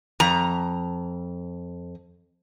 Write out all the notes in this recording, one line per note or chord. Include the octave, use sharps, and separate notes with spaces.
F2 A#5